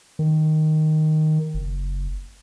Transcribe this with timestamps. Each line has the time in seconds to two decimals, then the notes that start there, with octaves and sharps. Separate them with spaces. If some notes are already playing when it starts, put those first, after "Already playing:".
0.19 D#3
1.54 F#1